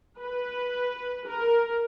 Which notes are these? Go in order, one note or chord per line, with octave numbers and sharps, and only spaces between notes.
B4
A#4